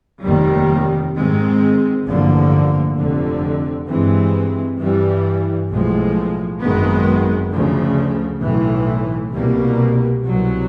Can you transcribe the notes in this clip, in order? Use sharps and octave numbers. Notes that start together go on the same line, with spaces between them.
F1 D#2 D#3 G3
G#2 D#3 G#3 C4
A1 G2 D3 F3 A#3
F1 F2 D3
G2 E3 G#3 C4
G2 E3 G3
B1 A2 F3 G#3
G#1 F#2 D#3 G#3 B3
D2 C#3 F3
B1 A2 E3
C2 B2 G3 A#3
C2 B2 F#3